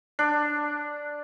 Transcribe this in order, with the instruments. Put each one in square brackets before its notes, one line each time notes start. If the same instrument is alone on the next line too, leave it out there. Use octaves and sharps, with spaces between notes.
[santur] D4